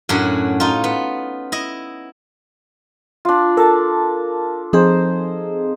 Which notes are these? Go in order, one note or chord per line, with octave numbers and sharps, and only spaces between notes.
F#2 A2 C#4 D4 F#4
D#4 F4
B3
E4 D#5
D4 F4
A4 A#4 A5
F3 C4 D#4 G#4 C5